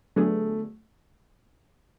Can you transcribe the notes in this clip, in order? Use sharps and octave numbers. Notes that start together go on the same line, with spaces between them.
D3 F#3 A3 B3 D4 G#4